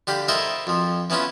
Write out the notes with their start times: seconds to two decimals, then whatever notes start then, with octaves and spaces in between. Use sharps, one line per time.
0.07 D3 G4 F5 G5 B5
0.28 E4 A4 A#4 C5 D#5 E5
0.67 F2 F3
1.10 E3 B3 C#4 E4 F4